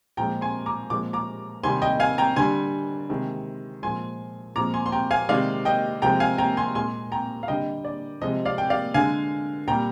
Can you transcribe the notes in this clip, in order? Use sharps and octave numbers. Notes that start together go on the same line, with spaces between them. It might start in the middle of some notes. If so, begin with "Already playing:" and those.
A#2 F3 G#3 G5 A#5
G#5 C6
A#5 D6
A#2 F3 G#3 D6
A#5 D6
C3 D#3 G3 G#5 C6
D#5 G5
F5 G#5
G5 A#5
D3 G3 G#5 C6
C3 D#3 G#3
A#2 F3 G#3 G#5 C6
A#2 F3 G#3 A#5 D6
G#5 C6
C6
G5 A#5
F5 G#5
C3 D#3 G#3 D5 F5
D#5 G5
C3 F3 G#3 G5 A#5
F5 G#5
G5 A#5
G#5 C6
A#2 G#3 G#5 C6
G5 A#5
F5
D3 G3 D#5 G5
D5
C3 F3 G#3 D#5
D5 F5
G5
D5 F5
D3 G#3 F5 G#5
A#2 G3 G5 A#5